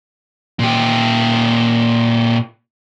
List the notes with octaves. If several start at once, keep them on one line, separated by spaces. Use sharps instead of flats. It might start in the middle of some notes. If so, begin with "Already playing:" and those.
A#2 G4